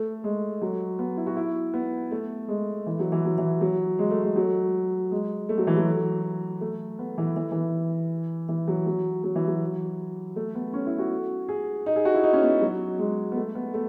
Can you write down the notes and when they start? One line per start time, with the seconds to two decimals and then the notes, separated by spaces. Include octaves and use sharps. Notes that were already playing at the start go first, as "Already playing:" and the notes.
Already playing: A3
0.24 G#3
0.62 F#3
0.99 B3
1.17 E4
1.27 F#4
1.36 E4
1.73 B3
2.11 A3
2.48 G#3
2.86 E3
2.99 F#3
3.12 E3
3.25 F#3
3.38 E3
3.61 F#3
3.99 G#3
4.11 A3
4.22 G#3
4.36 F#3
5.11 G#3
5.49 A3
5.58 F#3
5.67 E3
5.77 F#3
6.61 A3
6.99 B3
7.18 E3
7.36 E3
7.51 E3
8.49 E3
8.68 F#3
8.86 F#3
9.24 F#3
9.36 E3
9.47 F#3
10.36 A3
10.55 B3
10.73 C#4
10.86 E4
10.99 F#4
11.49 G#4
11.86 D#4
11.96 G#4
12.05 F#4
12.14 E4
12.23 D#4
12.33 C#4
12.42 B3
12.62 F#3
12.99 G#3
13.32 B3
13.36 A3
13.55 B3
13.74 A3